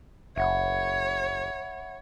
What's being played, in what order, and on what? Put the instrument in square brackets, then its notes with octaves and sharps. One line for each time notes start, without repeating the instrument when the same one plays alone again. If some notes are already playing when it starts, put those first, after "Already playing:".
[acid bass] F#1 [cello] C#5 [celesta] E5 F#5 B5